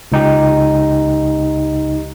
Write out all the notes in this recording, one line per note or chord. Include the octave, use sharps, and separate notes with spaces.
C#2 D#4 G4